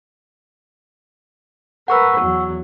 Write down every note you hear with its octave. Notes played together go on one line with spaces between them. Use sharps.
A#4 B4 F#5 C#6 E6
E2 F#3